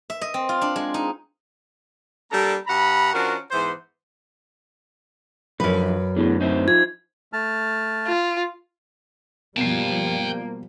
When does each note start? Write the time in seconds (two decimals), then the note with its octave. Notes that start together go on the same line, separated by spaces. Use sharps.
0.10 E5
0.21 D#5
0.34 C4
0.49 F4
0.61 D4
0.76 G#3
0.94 D#4
2.32 G3 A#3 D4 A4 A#5
2.67 G2 F#5 A#5 B5
3.13 F3 C#4 D4 F#4 A#4
3.51 G#2 E3 B3 C5
5.60 F#2 D3 F3 B4
6.17 E2 A2 D3
6.41 D1 D#4 C5 E5
6.68 F3 G#6
7.33 A3 A5 F6
8.07 F4
9.57 B2 F3 G3 A#3 G5 A5 C7